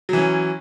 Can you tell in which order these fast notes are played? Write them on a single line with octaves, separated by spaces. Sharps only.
F#3 E3 C#4